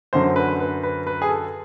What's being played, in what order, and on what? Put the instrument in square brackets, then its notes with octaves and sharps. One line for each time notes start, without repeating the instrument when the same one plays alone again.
[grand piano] F#2 D3 F#3 C5
B4
B4
B4
B4
G#4
A4